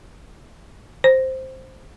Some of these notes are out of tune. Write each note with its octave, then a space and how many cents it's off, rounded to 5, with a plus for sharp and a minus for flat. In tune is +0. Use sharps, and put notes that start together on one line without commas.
C5 +0